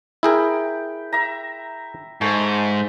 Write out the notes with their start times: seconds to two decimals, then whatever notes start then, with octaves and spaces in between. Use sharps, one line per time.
0.23 E4 G#4 A#4 G5 B5
1.12 E5 A#5
2.21 G#2 A3